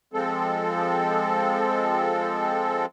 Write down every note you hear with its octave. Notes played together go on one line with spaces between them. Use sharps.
F3 G#3 C4 A4